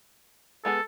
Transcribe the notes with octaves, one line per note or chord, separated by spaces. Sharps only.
G#3 B3 G#4 A4